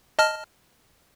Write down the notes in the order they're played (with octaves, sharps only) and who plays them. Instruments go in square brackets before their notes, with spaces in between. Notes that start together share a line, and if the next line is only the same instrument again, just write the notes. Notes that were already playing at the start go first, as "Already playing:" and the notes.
[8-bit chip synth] D#5 A5 F6